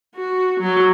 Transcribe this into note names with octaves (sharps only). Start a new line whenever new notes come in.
F#4
F#3